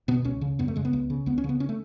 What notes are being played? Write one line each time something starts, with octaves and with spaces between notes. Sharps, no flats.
B2 B3
C#2 C#4
C#3
F#2 B3
A3
C#3 G#3
B3
C#2
C#3
C#2 B3
C#4
C#3
B3
C#4
A3